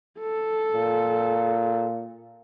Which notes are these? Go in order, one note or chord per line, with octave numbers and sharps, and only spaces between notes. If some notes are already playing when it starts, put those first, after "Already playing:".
A4
A#2